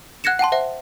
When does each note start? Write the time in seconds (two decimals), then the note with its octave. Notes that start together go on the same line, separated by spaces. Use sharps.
0.24 F#5 F#6 G#6 A#6 C#7 E7
0.39 F#5 G5 A5 C6
0.52 C5 E5 F#5